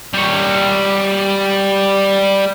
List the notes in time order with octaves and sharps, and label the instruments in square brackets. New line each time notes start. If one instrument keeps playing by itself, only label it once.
[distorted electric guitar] G3 C#5